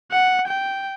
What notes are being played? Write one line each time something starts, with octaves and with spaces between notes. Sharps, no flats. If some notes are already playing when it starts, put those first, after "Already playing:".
F#5
G5